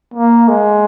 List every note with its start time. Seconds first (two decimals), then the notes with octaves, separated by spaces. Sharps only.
0.14 A#3
0.48 G#3